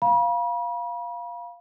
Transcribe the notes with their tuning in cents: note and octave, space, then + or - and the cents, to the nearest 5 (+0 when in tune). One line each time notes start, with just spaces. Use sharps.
F5 +0 B5 -40